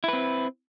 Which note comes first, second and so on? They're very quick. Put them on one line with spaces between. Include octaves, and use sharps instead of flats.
E4 B4 C4